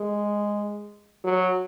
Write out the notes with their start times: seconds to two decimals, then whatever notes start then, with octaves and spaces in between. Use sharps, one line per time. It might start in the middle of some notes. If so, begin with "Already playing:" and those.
Already playing: G#3
1.24 F#3